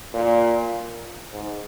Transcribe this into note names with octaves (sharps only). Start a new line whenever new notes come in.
A#2
G#2